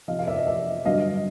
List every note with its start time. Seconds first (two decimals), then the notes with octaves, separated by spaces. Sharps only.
0.08 F2 C3 F3 D#5 F5
0.19 F5
0.27 D5 E5
0.37 D#5
0.47 D5 E5
0.85 G2 D3 F#3 D#5 F5